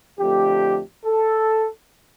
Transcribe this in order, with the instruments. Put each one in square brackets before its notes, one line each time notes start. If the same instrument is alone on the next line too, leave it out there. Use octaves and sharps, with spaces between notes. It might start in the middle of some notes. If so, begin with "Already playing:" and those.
[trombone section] F2 D3 A3 G4
A4